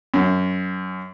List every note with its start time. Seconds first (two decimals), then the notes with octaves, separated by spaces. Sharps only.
0.14 F#2